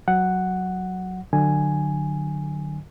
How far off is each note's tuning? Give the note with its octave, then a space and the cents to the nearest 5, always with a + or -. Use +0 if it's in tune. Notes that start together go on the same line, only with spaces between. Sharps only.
F#3 +0 F#5 +0
D3 +30 F#3 +0 G#5 +0